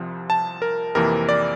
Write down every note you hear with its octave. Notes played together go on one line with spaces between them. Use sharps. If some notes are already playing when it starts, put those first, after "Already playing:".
Already playing: C2 C3 F3
A5
A#4
F2 C3 E3 A#3 A#4
D5